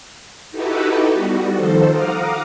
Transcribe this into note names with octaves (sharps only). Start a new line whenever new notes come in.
D#4 E4 F#4 G4 A4 B4
G3 B3 F#4
D#3 F3 A4 C5
F5 F#5 A#5 D6 D#6 F6